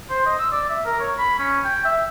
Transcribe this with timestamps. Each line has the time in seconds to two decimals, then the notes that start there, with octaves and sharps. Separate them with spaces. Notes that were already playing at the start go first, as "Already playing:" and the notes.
0.11 C5
0.26 D#5
0.40 E6
0.52 D5
0.70 E5
0.86 A#4
1.00 C#5
1.19 B5
1.39 C#4
1.65 G5
1.85 E5